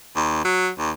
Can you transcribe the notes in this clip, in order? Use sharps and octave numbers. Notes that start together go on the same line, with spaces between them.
D#2
F#3
D#2